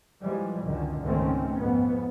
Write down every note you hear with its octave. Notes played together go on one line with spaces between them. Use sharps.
E3 F3 G3 G#3
C#2 F#2 D3 D#3
C#2 G#2 D#3 A3 C4 C#4
F2 G#2 B3